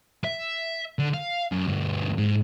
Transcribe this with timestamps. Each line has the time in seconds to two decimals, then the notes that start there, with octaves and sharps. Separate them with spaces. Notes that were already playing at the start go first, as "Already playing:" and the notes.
0.24 E5
0.99 D3
1.14 F5
1.52 F#2
1.67 D2 G2
2.18 G#2